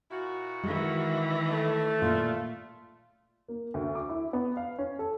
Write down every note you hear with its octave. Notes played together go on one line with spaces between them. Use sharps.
A#2 E4 F#4
D#3 E3 G#3
A3
A#2 F4
A#3
D2
D6
E4
B3
F5
C#4
A4